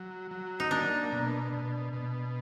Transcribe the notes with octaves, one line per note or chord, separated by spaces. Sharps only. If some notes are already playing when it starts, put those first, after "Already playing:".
Already playing: F#3
F#3
D#4
A#3 D4
B2
B2
B2